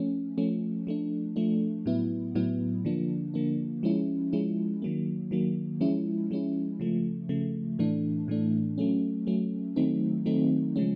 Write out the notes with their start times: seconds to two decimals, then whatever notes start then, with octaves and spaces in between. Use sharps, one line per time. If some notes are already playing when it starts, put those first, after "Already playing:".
Already playing: F3 A3 C#4
0.38 F3 A3 C#4
0.87 F3 A3 D4
1.36 F3 A3 D4
1.86 A2 F#3 B3 E4
2.35 A2 F#3 B3 E4
2.85 D3 F3 A#3 D4
3.34 D3 F3 A#3 D4
3.83 F3 G#3 C#4 E4
4.33 F3 G#3 C#4 E4
4.82 D#3 F#3 A#3
5.31 D#3 F#3 A#3
5.81 F3 G#3 C#4 E4
6.31 F3 G#3 C#4 E4
6.80 C#3 F3 A3
7.29 C#3 F3 A3
7.79 A2 E3 A3 D4
8.28 A2 E3 A3 D4
8.78 F#3 A3 C#4
9.27 F#3 A3 C#4
9.76 D#3 F#3 A3 C4 D#4
10.26 D#3 F#3 A3 C4 D#4
10.76 C#3 F3 G#3 C#4